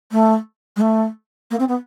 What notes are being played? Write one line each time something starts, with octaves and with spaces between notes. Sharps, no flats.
A3
G#3
A3
A#3
C4
B3